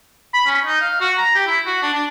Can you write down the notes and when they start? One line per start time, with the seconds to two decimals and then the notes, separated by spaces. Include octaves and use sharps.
0.34 B5
0.47 C#4
0.65 D#4
0.81 F5
1.01 F#4
1.18 A#5
1.35 G4
1.46 E4
1.66 F#4
1.82 D4
1.94 D4